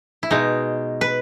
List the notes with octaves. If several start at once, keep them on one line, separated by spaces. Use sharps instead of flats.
E4
B2 G#3 D#4
B4